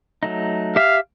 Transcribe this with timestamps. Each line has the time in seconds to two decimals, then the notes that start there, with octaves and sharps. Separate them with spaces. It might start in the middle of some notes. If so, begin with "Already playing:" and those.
0.23 F#3 A3 D#4
0.76 G4 E5 F5